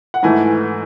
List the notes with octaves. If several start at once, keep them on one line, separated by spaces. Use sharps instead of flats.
F#5
G#2 E3 A3 G#5